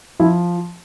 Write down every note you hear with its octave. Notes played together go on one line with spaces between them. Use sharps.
F3 E4